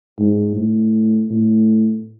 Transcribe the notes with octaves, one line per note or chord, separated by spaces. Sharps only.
G#2
A2
A2